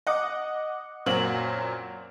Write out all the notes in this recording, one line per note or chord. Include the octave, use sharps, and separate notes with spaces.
D#5 F#5 D6
F#2 A#2 F#3 A#3 C4 F#7